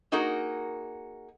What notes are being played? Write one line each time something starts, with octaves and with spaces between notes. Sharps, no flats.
A#3 D#4 F#4 G#4 A#4